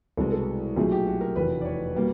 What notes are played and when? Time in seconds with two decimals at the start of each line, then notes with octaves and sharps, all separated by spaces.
0.17 C2 B2 G#3 A4
0.32 A4
0.76 B1 A#2 F#3 A3 G#4
0.92 G4
1.07 F#4
1.21 A#4
1.35 F1 E2 B2 B4
1.61 D5
1.65 C#5
1.95 B2 G3 A#3